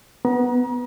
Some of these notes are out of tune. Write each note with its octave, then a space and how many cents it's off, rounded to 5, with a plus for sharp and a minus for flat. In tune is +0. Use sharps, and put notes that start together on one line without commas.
B3 +0 A#5 +40